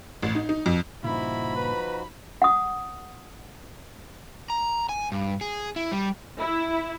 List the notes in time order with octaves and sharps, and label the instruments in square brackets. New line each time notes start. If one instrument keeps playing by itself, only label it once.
[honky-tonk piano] A1
D#4
D#4
F2
[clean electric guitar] G2 A#2 C#3 [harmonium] F3 D#4 F#4 [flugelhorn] E4 [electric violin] B5
[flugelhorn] B4
[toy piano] F#5 D#6
[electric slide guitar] A#5
G#5
G2
G#4
E4
G3
[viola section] E4